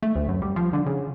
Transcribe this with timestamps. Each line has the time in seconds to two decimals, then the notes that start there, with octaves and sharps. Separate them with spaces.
0.02 A3
0.15 D2
0.28 F#2
0.42 G3
0.56 F3
0.73 D3
0.86 C#3